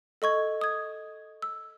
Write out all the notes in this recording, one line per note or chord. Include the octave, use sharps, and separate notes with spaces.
A4 D#5 C#6 G#6
D#6 G#6
E6